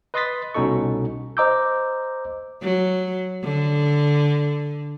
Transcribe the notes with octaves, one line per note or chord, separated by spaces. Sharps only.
B4 D#5 C6 D#6 A6 B6
C2 B2 C#4 D#4 A4 C#6
C5 D#5 A#5 D6 E6 G6
F#3
D3